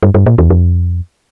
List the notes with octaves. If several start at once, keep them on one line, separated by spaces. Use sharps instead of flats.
G2
G2
A#2
E2
F2